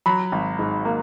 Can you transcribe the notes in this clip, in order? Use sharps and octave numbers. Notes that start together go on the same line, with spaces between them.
F#3 B5
G#1
G#2
A#3